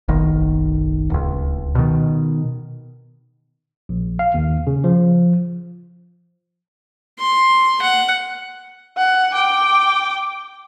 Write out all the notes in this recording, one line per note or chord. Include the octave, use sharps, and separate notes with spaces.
F#1 B1 D#3
D1 C#2
B2 D#3
A#1
F5
D#2
C#3
F3
C6
F#5
F#5
G5 D6